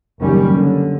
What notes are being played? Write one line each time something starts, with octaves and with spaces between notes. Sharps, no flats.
F#1 D#3 G3 C#4
D3